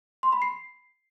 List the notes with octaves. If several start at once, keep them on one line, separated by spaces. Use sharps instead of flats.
C6
B5
C7